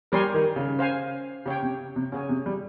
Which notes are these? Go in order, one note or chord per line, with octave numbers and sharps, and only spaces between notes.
G3 G4 A#4 C#5 G#5 C6
D#3
C#3
C5 F5 G#5
C#3 G4 C#5 G5
C3
C3
C#3 C#4 G#4 C#5 G#5
C3
G3